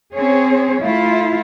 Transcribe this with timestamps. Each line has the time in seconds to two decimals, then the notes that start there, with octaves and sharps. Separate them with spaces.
0.14 C4 C#4 G#4 C#5
0.81 A3 E4 F4